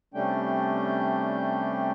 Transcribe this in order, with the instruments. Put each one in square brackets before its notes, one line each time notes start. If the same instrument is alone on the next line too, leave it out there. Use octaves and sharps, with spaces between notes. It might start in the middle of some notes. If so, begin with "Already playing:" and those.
[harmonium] C3 G3 A3 C#4 D4 G5